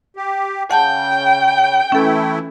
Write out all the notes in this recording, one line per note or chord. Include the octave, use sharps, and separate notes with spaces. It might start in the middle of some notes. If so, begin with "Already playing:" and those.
G4
C#3 F#5 G5 A5 G6
E3 A3 C#4 E4 A4